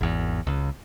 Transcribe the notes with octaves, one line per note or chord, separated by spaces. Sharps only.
G#1 E2
C#2